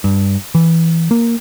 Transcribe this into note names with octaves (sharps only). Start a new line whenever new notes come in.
G2
E3
A#3